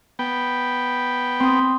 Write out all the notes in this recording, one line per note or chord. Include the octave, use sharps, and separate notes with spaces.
B3 G5
C4 D#6